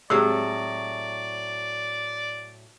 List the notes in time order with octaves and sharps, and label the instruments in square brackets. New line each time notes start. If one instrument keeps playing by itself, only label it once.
[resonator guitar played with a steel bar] A2 F#3 [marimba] C4 G4 G#4 [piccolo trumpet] D5 [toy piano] E6